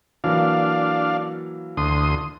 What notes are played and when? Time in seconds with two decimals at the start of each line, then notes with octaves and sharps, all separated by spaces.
0.24 E3 F#3 A#3 D4 F5
1.77 D2 C6 D#6